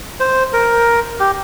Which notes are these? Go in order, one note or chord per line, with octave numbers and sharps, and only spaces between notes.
C5
A#4
G4